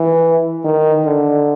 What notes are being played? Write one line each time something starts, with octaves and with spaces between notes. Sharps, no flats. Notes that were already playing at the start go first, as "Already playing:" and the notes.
Already playing: E3
D#3
D3